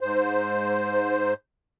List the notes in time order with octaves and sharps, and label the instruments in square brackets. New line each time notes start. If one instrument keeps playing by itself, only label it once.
[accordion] G#2 C5